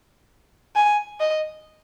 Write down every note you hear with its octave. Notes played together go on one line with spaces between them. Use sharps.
G#5
D#5